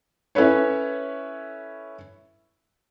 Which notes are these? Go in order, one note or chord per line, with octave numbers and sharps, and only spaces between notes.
C#4 E4 A4 B4 C#5